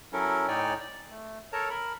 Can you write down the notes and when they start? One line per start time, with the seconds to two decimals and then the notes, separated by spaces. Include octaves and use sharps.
0.13 F#3 C#4 E4 A4 A#4
0.48 A2 D#4 C#5 D5 G5 G#5
0.80 D5
1.10 A3
1.53 A4 A#4 C#5 A5 A#5
1.70 A#4 B5